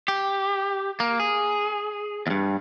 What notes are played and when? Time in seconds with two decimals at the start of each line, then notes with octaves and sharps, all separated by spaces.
0.08 G4
1.00 A#3
1.20 G#4
2.27 E2 G2